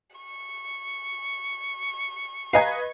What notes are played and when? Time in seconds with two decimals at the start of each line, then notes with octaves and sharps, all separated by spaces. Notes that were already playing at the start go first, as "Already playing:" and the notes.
0.16 C#6
2.53 B4 D#5 F5 G#5 A#5 G#6